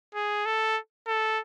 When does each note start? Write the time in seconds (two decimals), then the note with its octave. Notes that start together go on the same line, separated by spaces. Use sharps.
0.15 G#4
0.46 A4
1.07 A4